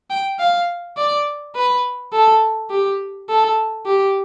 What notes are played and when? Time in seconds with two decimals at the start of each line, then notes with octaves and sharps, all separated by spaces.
0.10 G5
0.39 F5
0.97 D5
1.56 B4
2.13 A4
2.70 G4
3.29 A4
3.86 G4